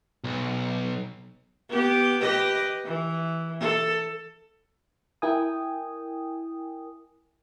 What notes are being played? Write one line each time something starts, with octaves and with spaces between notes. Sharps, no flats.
B1
B3 G4
G4 B4 D#5
E3
A4
E4 A#4 G5 G#5 D#6